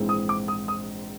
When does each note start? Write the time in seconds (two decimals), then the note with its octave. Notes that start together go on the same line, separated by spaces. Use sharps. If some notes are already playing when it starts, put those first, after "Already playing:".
Already playing: A#1 G#2 E3 G#3 C4
0.09 D#6
0.29 D6
0.48 D#6
0.68 D#6